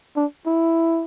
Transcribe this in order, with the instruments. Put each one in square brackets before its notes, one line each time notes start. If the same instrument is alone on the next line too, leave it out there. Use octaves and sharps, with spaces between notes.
[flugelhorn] D4
E4